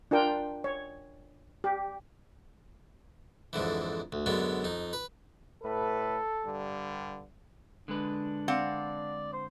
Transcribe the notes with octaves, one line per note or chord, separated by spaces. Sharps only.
D4 F4 A#4 G5
C#5
G4
F2 G#2 D3 E3
D2
F#2 D3 G#3 B3
F2 D#4
B4
A2 A4 B4
G2 D3 G3
D3 G#3 D4 B4
C4 D5 F5 F#5
C5